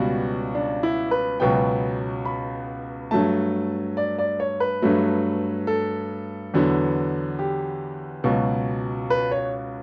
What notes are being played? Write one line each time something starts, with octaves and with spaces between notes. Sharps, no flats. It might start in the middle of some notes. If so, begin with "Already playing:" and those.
Already playing: C#2 B2 G3 B3 F#4
D4
E4
B4
C#2 B2 F#3 B3 G5
B5
G2 F#3 A3 A5
D5
D5
C#5
B4
G2 F#3 A3
A4
E2 D3 F#3 B3
G4
C#2 B2 F#3
B4
C#5